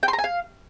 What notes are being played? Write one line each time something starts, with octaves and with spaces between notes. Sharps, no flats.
G5
C6
A#5
G#5
F5